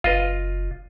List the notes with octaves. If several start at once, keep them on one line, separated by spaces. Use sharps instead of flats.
F#1 F4 B4 D#5 F5